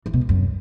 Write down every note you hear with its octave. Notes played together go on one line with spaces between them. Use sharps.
E3
B2
C#3
F#2